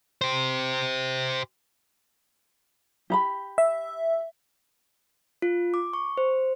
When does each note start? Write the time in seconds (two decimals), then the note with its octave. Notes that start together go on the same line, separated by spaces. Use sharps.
0.21 G4 C5
3.10 G4 A#5 B5
3.58 E5
5.42 F4
5.74 D6
5.93 C#6
6.17 C5